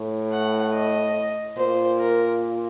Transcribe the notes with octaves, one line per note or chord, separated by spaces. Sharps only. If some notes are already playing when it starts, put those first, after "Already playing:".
Already playing: A2
F#5
D#5
A#2 C5
A#4